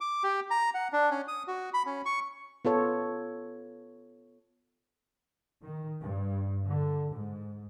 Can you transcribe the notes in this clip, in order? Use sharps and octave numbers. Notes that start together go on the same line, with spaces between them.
D6
G4
A#5
F#5
D4
C#4
D#6
F#4
B5
C#4
C#6
B3 F4 A4 C#5
D#3
G2
D3
G#2